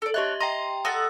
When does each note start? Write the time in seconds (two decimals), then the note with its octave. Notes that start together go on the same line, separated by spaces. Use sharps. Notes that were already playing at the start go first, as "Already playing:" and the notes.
0.02 A4 D5
0.14 D4 G4 C#5 D#5 E5 F#6
0.40 D#5 G5 A#5 C6
0.85 A4 D#5 F#5 D#6 A6